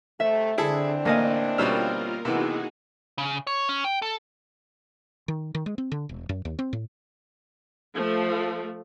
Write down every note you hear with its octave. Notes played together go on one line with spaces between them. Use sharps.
C3 A3 E5
D3 E3 C4 D4 E4 G#4 A4
A1 A#3 D#5 F5 G#5
B2 G3 C#4 F4 A#4 E6 F6
C3 D#3 E3 B3 D#4 F#4 G#4
C#3
C#5
C#4
G5
A4
D#3
D#3
G#3
C4
D3
E1
F#2
D#2
C4
A2
F3 A3